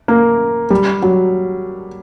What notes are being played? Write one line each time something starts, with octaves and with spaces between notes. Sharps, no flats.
A#3
G3
F#3